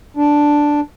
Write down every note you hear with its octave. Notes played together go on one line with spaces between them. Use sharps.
D4